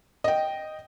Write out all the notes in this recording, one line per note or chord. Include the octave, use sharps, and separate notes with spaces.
D#5 G5